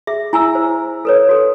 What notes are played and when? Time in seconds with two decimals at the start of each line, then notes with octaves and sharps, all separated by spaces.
0.07 G#4 E5
0.33 E4 G#5 A#5 E6
0.55 C5
1.05 A4 B4 C#5
1.29 F#4 A4